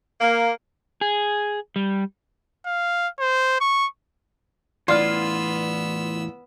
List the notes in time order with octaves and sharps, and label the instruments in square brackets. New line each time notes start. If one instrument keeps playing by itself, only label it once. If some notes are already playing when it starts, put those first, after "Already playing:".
[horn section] A#3
[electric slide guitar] G#4
G3
[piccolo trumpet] F5
C5
C#6
[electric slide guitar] E2 A2 E3 [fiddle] B3 E6 [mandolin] F4 [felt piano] D5 F6